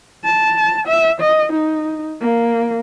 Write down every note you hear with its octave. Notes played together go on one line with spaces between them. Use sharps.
A5
E5
D#5
D#4
A#3